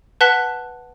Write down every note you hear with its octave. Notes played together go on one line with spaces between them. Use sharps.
B4 F#5 A5 F#6 B6 G7